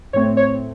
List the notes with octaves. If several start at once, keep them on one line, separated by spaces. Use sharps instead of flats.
A2 A3 C4 C#5
C#5